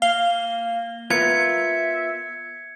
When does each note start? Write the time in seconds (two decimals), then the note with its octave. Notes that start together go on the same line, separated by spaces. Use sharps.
0.02 A#3 F5 G7
1.10 B3 F4 A#4 E5 G#6 C#7